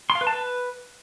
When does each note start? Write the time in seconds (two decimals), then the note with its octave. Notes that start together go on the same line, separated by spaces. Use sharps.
0.10 C6
0.15 F5
0.21 B4
0.27 A5
0.32 B4